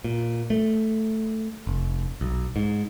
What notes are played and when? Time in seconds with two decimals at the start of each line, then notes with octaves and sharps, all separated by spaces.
0.04 A#2
0.50 A3
1.67 F1
2.21 B1
2.56 G#2